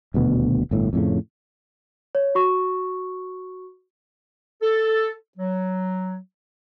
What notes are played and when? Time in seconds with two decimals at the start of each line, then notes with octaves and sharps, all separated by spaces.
0.14 D#1 D2 B2 B3
0.71 G1 A2
0.93 F2 A2 C#3
2.15 C#5
2.35 F#4 C#6
4.62 A4
5.38 F#3